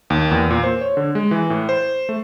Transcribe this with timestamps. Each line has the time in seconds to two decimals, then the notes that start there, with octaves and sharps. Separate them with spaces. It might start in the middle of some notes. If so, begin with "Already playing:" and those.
0.10 D#2
0.31 E2
0.50 A#2
0.63 C5
0.81 C#5
0.97 D3
1.15 G#3
1.31 E3
1.50 A2
1.69 C5
2.09 A3